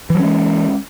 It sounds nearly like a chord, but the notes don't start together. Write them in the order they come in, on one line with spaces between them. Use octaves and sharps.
E3 F#3 C#4 G#3